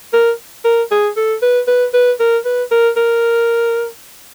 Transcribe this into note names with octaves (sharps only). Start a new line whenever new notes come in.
A#4
A#4
G#4
A4
B4
B4
B4
A#4
B4
A#4
A#4